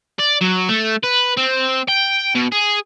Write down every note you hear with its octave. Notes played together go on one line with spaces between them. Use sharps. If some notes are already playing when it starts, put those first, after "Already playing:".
D5
F#3
A3
B4
C4
G5
B2
G#4